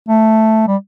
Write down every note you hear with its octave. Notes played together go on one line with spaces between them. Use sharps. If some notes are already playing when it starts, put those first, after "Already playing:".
A3
G3